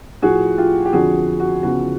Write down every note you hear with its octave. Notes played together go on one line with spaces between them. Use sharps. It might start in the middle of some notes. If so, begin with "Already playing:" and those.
A2 F3 F#4 G#4
F4 G4
G4
F2 D3 F3 F#4 G#4
F#4
E2 C#3 F3 F#4